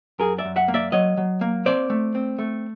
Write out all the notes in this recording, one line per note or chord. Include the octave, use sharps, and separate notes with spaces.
F#2 G#4 A#4
D5 E5
F#2
E5 F#5
A#3
D5 E5
F#3 C#5 D#5
F#3
A#3
C4 C5 D5
A3
C4
A3